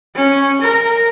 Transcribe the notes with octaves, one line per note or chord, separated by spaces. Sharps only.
C#4
A#4